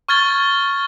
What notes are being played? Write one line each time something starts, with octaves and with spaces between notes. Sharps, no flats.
C#6 F6 G#6 A6 G7